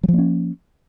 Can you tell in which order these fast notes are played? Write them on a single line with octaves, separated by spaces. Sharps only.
F#3 F3 A#3 C#4